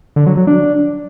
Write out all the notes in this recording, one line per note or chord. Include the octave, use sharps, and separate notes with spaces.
D3
F#3
F#3
D4